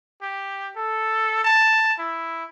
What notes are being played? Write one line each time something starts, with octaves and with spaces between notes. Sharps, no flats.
G4
A4
A5
E4